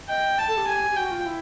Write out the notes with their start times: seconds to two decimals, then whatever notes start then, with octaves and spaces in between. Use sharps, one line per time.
0.09 D#5 G5
0.39 A5
0.48 A4
0.57 G4
0.67 G#5
0.91 G4
0.96 F#4 G5
1.11 F4
1.26 E4